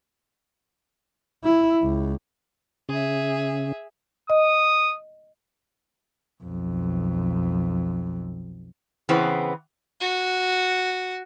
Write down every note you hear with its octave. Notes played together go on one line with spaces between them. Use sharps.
E4
C#2
C#3 G#4 E5
D#5 D#6
B1 F2
C#3 E3 B3 C4
F#4